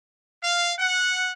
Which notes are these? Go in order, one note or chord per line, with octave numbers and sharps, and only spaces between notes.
F5
F#5